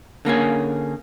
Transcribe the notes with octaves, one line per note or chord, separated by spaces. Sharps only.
D3 A#3 C#4 G#4